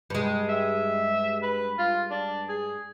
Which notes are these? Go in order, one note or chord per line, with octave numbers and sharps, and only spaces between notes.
G2 G#3
E5
B4
F4
D4
G#4